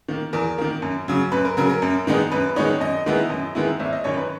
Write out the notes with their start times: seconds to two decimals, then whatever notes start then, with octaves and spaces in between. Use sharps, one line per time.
0.08 D#3 A#3
0.33 E2 A#4
0.58 D#3 A#3
0.82 F#2
1.08 C#3 F#3
1.32 F#2 B4
1.45 A#4
1.57 C#3 F#3 A#4
1.70 A#4
1.82 F#2
2.07 D#3 G#3 B3 D#4
2.32 F#2 B4
2.56 D#3 G#3 B3 D#4 C#5
2.80 F#2 D#5
3.06 D#3 G#3 B3 E4
3.30 F#2
3.55 D#3 G#3 B3 E4
3.80 G#1 E5
3.93 D#5
4.04 F#2 D#3 C#5
4.17 B4